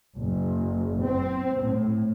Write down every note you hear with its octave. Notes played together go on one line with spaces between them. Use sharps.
F#1
C4
A2